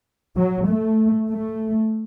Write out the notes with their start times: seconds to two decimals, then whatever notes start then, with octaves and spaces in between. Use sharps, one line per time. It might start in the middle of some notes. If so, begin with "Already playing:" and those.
0.35 F#3
0.67 A3
1.30 A3